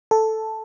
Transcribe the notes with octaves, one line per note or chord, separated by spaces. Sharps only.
A4